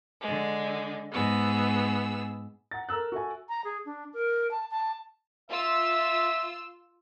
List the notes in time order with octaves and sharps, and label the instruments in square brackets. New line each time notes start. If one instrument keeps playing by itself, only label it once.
[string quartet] D3 G#3
G#2 B3 G#4 E6
[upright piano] F#5 A#5 A6
A4 A#4 A#5 E6 F#6
F#4 A4 E5 G#5
[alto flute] A#5
G#4
D4
A#4
A5
A5
[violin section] F4 E6 [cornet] E5